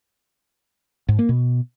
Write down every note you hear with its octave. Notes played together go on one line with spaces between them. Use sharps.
G#2
A#3
B2